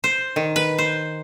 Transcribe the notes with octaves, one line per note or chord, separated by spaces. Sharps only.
C5
D#3
B4
C5